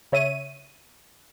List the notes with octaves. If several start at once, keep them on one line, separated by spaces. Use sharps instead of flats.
C#3 C#5 E5 D#7